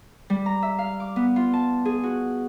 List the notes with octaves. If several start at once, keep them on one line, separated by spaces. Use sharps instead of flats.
G3
A#5
E5
F5
D6
B3
F4
A5
G#4
F#4